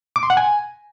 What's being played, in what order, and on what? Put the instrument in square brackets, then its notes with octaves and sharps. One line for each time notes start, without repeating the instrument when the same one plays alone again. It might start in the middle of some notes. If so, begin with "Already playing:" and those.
[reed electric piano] D6
C6
F#5
G#5